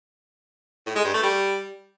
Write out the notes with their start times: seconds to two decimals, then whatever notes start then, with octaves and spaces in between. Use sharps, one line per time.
0.86 A2
0.96 G#3
1.05 G2
1.14 A3
1.23 G3